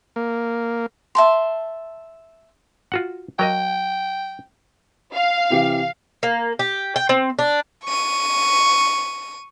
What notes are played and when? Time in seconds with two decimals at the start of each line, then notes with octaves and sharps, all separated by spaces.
0.16 A#3
1.15 E5 A5 C6
2.92 F4 F#4 F#5
3.39 F#3 A#4 D#5 G5
5.13 F5
5.50 C3 E3 G4
6.23 A#3
6.59 G4
6.96 G5
7.09 C4
7.39 D4
7.84 C#6 D#7